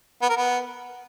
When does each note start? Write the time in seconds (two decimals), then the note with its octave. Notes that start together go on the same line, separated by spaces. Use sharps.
0.22 B3
0.29 A#4
0.37 B3